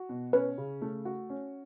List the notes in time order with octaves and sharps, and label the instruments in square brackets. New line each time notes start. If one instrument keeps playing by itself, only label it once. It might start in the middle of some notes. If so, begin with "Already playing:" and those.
Already playing: [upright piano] F#4
B2
[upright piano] C#4 [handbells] B4
[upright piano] C#3
A3
F#4
C#4